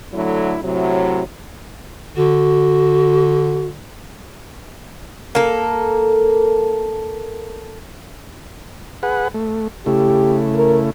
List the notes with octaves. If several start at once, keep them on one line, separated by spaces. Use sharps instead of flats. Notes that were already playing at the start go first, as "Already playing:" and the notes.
D3 F#3 A3 E4
A2 C3 F#3
D3 F#4
A#3 A4
G#4 B4 F#5
A3
C#3 A3 E4 G4
A#4